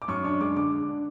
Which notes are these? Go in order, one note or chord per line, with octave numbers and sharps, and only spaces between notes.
D6
F#2 C#6
D4 C#6
G#3 D6
D3 D6
D3
D4